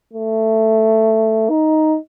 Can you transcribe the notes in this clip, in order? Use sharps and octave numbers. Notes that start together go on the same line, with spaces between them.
A3
D#4